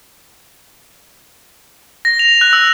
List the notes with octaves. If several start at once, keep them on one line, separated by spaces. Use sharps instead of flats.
A#6
F7
F#6
E6